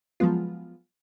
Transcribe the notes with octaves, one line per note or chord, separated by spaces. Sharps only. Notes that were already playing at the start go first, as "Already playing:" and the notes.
F3 F#3 G#3 B3 F4